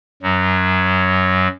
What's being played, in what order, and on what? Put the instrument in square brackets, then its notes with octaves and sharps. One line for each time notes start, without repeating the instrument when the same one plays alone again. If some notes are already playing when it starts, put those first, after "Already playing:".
[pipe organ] F#2 F#3